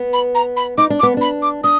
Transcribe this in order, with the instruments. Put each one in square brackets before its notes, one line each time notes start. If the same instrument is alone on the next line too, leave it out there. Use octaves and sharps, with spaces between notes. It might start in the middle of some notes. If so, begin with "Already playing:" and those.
Already playing: [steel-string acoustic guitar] B3
[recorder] B5
A#5
B5
[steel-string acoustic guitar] D#4 [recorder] D6
[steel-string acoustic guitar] D4
[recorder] D6
[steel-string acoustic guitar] B3
[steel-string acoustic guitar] D4 [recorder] B5
[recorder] D6
[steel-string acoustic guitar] D4 [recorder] D#6